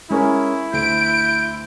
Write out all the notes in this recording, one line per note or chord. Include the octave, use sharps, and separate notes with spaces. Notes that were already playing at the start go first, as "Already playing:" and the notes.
G#3 C#4 E4 A#4
D2 G6 D7